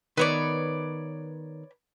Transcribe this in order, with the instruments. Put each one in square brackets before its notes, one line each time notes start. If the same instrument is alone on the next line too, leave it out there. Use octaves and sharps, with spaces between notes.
[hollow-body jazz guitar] D#3 B3 [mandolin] B4 C#5 D5